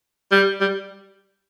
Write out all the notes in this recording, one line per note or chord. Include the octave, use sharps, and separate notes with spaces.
G3
G3